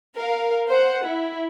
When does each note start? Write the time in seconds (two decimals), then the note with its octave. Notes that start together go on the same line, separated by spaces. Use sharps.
0.17 A#4 F5
0.69 C5 F#5
1.06 E4